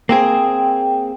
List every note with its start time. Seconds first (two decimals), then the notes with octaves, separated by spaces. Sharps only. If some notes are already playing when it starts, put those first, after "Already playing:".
0.09 A#3 C4 G#4 G5